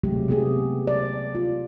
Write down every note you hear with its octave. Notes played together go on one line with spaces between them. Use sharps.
C3 F#3 G#3 A3 G4
C3 B3 G4 G#4
D5
F4